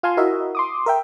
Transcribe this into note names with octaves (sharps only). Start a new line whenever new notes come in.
F4 F5 G#5 A5 C6
E4 F#4 A#4 D#5 E5
C6 D6 D#6
A#4 E5 G5